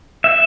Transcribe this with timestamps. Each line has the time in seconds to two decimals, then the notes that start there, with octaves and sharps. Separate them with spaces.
0.24 E5